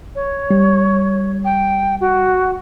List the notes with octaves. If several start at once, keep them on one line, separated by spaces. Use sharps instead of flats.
C#5
G3
G5
F#4